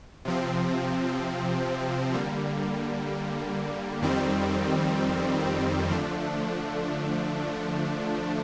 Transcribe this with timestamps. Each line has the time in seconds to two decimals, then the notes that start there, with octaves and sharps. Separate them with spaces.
0.25 C3 F3 C4
2.14 D3 G3 A#3
4.02 F2 D#3 G3 C4
5.90 D3 F3 A3 D4